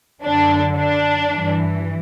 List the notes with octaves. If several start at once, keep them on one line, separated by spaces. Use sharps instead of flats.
F#2 D3 D4
D4
G2 E3